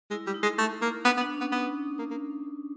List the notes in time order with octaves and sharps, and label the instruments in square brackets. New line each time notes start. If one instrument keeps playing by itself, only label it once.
[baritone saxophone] G#3 [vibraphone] E4
[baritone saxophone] G3
[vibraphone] D#4
[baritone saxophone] G#3
A3
A#3
[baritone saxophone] B3 [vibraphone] D4
[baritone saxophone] B3
[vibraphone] D4
C#4
[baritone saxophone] B3
[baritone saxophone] B3 [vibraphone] D#4
[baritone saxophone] A#3
A#3